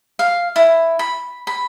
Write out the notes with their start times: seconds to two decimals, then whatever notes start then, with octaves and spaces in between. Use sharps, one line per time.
0.19 F5
0.56 E4
0.99 B5
1.47 B5